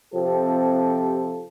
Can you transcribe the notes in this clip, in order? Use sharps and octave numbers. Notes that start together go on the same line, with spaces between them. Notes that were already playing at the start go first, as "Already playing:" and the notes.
C3 F3 C4 G4 A4